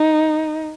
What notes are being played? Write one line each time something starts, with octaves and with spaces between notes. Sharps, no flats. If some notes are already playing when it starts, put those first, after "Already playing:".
Already playing: D#4